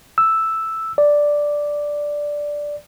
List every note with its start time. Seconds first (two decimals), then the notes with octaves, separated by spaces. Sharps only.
0.18 E6
0.98 D5